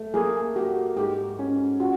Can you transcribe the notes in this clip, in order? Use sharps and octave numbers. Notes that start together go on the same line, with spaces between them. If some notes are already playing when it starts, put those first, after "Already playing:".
Already playing: A3
A#3 G#4
F#4 G4
G#2 G4
C#4
F4 F#4